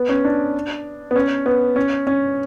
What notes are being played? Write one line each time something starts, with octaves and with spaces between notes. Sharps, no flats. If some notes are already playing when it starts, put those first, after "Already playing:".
Already playing: B3
C#4
D4
B3
C#4
B3
C#4
C#4